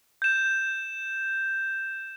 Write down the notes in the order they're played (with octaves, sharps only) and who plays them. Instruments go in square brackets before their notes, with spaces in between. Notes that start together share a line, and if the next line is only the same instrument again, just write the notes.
[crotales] G6 E7